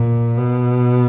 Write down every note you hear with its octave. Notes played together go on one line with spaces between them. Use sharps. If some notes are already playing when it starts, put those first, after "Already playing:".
Already playing: A#2
B2